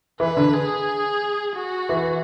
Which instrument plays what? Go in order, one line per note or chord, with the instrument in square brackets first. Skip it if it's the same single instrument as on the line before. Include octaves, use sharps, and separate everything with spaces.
[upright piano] E3 [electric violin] B4
[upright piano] D3
[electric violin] G#4
F#4
[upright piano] E3